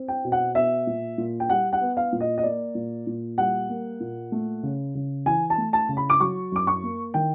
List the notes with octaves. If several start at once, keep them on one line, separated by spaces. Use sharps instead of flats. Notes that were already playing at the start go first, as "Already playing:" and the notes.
Already playing: C4
G5
B2
F#5
B3 E5
A#2
A#2
G5
G3 F#5
F#5
B3
F5
A#2
D#5
D#5
A#3 D5
A#2
A#2
G3 F#5
A#3
A#2
A3
C#3
C#3
E3 G#5
A5
A3
A5
C#3
B5
D6
F#3 C#6
F#2 D6
C#6
A#3
D#3 G5